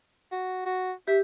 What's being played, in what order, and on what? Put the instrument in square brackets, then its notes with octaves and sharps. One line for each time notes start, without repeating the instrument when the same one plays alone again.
[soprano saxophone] F#4
F#4
[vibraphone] G4 [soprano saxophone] E5